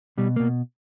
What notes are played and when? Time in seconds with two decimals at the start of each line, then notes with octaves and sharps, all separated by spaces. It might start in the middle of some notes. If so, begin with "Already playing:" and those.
0.18 B2 G3
0.36 B2 A#3